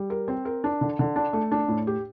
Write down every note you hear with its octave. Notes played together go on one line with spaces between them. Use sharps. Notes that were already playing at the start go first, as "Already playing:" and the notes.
Already playing: G3
A#4
C4
A#4
D4
D3
D3
D4
A3
D4
A2
G4